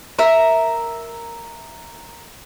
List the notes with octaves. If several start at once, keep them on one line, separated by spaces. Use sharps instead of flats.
A#4 E5